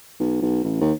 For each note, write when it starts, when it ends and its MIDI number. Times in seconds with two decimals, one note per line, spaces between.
0.20 0.40 35
0.42 0.62 35
0.64 0.79 33
0.81 0.93 39